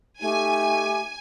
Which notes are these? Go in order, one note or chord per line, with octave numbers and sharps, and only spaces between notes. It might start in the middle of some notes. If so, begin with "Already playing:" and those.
A3 D#4 G4 G#5